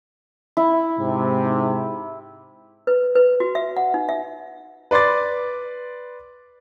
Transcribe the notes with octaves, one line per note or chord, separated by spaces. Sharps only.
E4
G#2 C3
B4
B4
F#4
E5
F#5
D#4
E5
B4 D5 C6 D6 A6